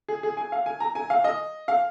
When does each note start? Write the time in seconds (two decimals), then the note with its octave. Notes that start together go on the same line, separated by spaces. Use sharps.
0.08 G#4
0.23 G#4
0.37 G#5
0.52 F5
0.66 G#5
0.80 A#5
0.95 G#5
1.10 F5
1.24 D#5
1.68 F5